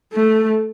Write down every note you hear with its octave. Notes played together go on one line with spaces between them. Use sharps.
A3